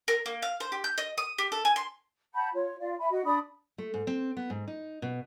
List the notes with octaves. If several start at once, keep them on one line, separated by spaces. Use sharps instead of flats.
A#4
A#3
F5
C5
G4
G6
D#5
D#6
G4
A4
G#5
C6
F#5 A5 B5 G6
F4 C#5
F4 D5 F5
E5 G#5 B5
F#4 D#5
D4 D5 B5 D#6
A3
G#2
C4
B3
G#2
D#4
B2